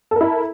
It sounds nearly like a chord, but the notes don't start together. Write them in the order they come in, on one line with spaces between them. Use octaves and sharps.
A4 A#4 E4